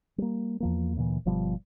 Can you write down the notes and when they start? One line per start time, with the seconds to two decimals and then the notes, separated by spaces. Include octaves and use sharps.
0.18 G3 A#3
0.60 E2 F3 A#3
0.97 D2 A#2 E3
1.25 G1 B2 F3 G3